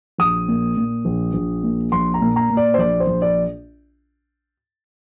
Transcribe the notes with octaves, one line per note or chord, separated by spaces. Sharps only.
A#1 D#6
A#2
A#2
A#1
A#1
A#2
A#1 C6
A#5
A#2
A#5
A#2
D5
C5
A#1 D5
C5
A#1
D5